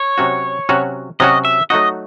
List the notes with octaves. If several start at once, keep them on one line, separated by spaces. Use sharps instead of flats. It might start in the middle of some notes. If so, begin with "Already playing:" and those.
Already playing: C#5
C3 F#3 C#4 F#4
C3 F#3 C#4 F#4
C3 F#3 C#4 F#4 D#5
E5
F#3 A3 D#4 F#4 D#5